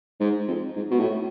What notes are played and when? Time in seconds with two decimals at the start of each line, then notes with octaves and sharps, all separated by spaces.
0.20 G#2
0.48 F2
0.76 G#2
0.91 B2
1.00 A2